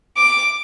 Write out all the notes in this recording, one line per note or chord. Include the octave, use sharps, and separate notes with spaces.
D6